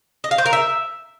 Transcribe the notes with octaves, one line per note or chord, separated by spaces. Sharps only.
D#5
F5
C5
A#4
E5